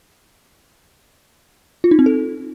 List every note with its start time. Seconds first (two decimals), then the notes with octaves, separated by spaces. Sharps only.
1.84 F4
1.91 D#4
1.99 C4
2.06 A4